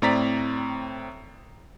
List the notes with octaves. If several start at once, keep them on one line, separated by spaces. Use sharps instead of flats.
A2 C4 D5 A#5 A6 B6